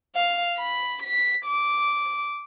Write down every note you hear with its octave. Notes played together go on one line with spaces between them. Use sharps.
F5
B5
B6
D6